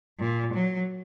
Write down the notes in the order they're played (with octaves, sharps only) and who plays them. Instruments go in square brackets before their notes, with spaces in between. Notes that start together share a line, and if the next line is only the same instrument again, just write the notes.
[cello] A#2
F#3